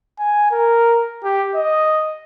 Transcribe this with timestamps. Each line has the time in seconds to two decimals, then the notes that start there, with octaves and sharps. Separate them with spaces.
0.19 G#5
0.51 A#4
1.24 G4
1.55 D#5